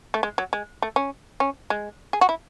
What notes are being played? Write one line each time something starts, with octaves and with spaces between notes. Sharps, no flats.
A3
G#3
F#3
G#3
A3
C#4
C#4
G#3
G#4
F#4
E4